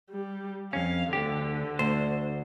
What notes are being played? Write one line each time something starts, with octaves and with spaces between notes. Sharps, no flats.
G3
F2 C#4 F5
D2 D3 G4
D2 C5